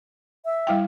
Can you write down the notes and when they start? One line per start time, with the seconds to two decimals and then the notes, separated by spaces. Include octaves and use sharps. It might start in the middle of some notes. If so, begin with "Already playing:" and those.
0.45 E5
0.67 G3 E4 G5